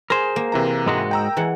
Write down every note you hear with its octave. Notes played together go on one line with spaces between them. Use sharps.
G#4 A#4 C5
A#3
C3 E3 A#5
G#2 G#3 F#4
G5 A#5 E6
E3 G#3 F#5